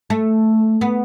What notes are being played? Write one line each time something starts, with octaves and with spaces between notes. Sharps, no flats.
A3
B3